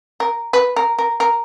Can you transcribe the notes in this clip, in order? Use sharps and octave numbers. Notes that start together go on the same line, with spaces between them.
A#4
B4
A#4
A#4
A#4